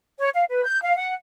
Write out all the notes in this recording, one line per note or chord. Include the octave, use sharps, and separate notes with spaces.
C#5
F5
B4
G6
F5
F#5